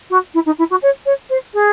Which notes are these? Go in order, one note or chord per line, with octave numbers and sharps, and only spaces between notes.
F#4
E4
D#4
E4
F#4
C#5
C#5
C5
G#4